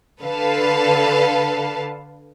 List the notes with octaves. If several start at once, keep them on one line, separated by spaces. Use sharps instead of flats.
D3 A4 B4 F5 A5